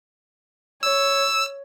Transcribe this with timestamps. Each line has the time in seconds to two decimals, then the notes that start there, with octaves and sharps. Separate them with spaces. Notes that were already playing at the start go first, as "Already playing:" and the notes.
0.83 C#5 E6